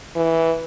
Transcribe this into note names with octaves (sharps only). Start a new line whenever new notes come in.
E3